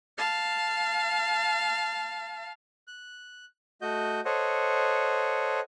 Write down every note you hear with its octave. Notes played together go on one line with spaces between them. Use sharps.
F5 A5
F#6
A3 F#4 D#5 G6
A4 C5 C#5 D#5 F#5